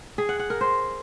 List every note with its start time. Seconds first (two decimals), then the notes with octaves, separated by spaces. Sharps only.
0.18 G#4
0.29 F#5
0.39 F#5
0.50 A#4
0.61 C5